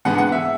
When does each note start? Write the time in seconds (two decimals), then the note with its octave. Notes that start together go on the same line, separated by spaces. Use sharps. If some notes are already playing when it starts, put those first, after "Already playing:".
0.05 G#2 E3 B3 D4 F#5
0.18 F#5
0.32 E5